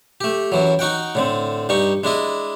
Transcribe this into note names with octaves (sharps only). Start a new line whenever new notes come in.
A3 G4
F#2 E3 F#3
D#4 F#4 F#5 G5
A2 D3 C4
G2 G3 D#4 C#6
G#3 D4 E4 D#5